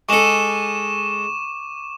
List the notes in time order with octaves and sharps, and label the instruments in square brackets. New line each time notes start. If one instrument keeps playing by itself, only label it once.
[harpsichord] G#3 A4 [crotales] C#6 D6 E7